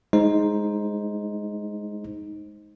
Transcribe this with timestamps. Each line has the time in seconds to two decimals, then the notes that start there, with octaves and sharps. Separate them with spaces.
0.13 G#3 D#4 C5